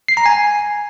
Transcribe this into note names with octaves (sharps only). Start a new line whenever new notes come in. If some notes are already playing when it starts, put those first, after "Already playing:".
C7
A#5
G#5